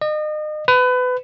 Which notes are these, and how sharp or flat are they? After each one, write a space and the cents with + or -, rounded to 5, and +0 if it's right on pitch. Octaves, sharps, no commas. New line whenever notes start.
D#5 -35
B4 +25